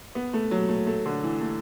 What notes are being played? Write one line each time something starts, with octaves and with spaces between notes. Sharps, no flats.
B3
A3
F#3
A3
A3
D3
E3
A3